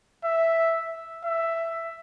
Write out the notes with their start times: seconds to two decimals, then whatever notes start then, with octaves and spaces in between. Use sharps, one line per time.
0.25 E5
1.25 E5